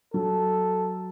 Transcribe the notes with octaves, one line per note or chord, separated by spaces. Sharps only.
F#3 A4